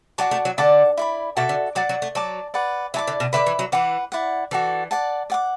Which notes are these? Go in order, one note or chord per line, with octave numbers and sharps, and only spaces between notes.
F#3 F#4 D5 A5 D6
A3
F#3
D3 D5 F#5 A5 D6
E4 D5 B5
B2 F#4 A4 E5 D6
D3
F#3 D5 F#5 D6
F#3
A3
F#3 D5 A5 D6
B4 D5 F#5
F#3 E4 D5 A5 D6
D3
B2
D3 B4 E5 B5 D6
E3
F#3
E3 B4 F#5 D6
E4 D5 F#5
E3 F#4 A4 D5
D5 F#5 A5
D5 F#5 D6